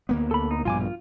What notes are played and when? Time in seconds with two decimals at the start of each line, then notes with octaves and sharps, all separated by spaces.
0.09 D2 A#3 B3
0.31 A4 B5
0.51 D#4
0.65 A#1 G2 B2 F4 G#5 D6
0.80 F4